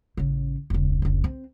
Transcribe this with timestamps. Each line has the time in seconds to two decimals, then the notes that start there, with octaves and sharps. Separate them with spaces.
0.17 A1 C#3
0.70 E1 C#2
1.02 F1 C#2
1.24 C4